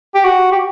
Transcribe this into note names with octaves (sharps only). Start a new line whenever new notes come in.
G4
F#4
G4